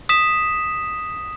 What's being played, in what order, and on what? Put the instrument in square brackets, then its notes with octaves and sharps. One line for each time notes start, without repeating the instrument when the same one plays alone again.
[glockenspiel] D#6 B6 E7